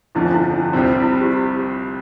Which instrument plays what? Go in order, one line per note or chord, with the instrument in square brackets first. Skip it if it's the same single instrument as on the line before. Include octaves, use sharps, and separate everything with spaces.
[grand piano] G1 F2 D3 F3 [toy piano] E4
[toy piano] D4
E4
D4
[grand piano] C2 C3 G3 C4
[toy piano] E4
F4
G4